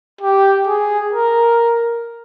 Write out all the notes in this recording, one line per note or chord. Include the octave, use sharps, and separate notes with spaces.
G4
G#4
A#4